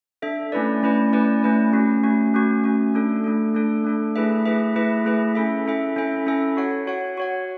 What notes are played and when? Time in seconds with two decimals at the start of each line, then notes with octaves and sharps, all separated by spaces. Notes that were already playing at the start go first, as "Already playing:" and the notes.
0.22 D4 A4 E5
0.52 A3 C#4 E4 B4 D5
0.83 A3 C#4 E4 B4 D5
1.13 A3 C#4 E4 B4 D5
1.43 A3 C#4 E4 B4 D5
1.73 A3 C#4 F#4
2.03 A3 C#4 F#4
2.34 A3 C#4 F#4
2.64 A3 C#4 F#4
2.94 A3 D4 A4
3.24 A3 D4 A4
3.55 A3 D4 A4
3.84 A3 D4 A4
4.16 A3 E4 G#4 B4 E5
4.46 A3 E4 G#4 B4 E5
4.75 A3 E4 G#4 B4 E5
5.05 A3 E4 G#4 B4 E5
5.35 C#4 E4 A4 E5
5.66 C#4 E4 A4 E5
5.96 C#4 E4 A4 E5
6.27 C#4 E4 A4 E5
6.57 F#4 C#5 F#5
6.87 F#4 C#5 F#5
7.17 F#4 C#5 F#5